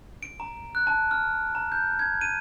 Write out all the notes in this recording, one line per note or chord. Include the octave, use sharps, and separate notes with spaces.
D7
A#5
F#6
A5
F6
A#5
G6
G#6
D#7